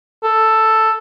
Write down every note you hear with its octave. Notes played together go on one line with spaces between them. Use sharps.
A4